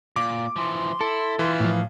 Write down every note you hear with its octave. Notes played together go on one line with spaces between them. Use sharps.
A#2 D6
E3 F3 C6
E4 A4
E3 F4 E5 C6
A2 F3 F5